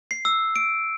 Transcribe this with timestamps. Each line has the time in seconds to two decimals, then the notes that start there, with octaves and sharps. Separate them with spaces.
0.11 C7
0.25 E6
0.56 D7